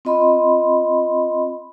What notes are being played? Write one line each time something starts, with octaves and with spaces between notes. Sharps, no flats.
C4 F4 D#5 B5 C6